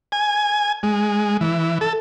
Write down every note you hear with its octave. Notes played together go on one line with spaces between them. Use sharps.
G#5
G#3
E3
A4